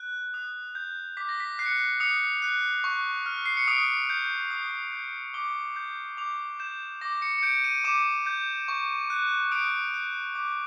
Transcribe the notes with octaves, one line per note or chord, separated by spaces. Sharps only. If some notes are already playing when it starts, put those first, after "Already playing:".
Already playing: F#6
D#6
G6
D6 B6
A#6
B6
F#6 C7
C#7
C7
D#6 C#7
F#6
C#6
F6
C7
C#7
D#6 D7
G6
D#6
G6
D6 G7
G6
D6 F7
G6 E7
D6 A#6
C#7
C#7
G6 D7
D#7
D6 E7
G6
C#6
F#6
D#6 D7
F#6
D6